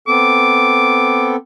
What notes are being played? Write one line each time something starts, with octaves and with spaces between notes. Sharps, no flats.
B3 C4 A4 D6